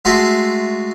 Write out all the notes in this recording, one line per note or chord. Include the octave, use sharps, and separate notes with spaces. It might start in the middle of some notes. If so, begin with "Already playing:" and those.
G#3 A3 F4 F#4 E5